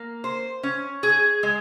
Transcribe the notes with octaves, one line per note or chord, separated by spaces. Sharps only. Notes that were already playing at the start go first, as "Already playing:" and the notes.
Already playing: A#3
C5
C#4
G#4
G#3